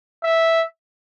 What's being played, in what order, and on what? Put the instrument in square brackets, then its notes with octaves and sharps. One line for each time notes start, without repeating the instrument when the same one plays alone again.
[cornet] E5